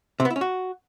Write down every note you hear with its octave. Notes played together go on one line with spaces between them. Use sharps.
C3
B3
E4
C#4
F#4